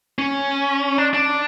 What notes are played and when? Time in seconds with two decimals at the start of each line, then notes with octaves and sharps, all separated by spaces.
0.19 C#4
0.98 D4
1.14 D4